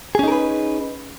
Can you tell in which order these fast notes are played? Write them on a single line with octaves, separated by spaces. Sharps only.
G#4 C#4 D#4 A#4 B4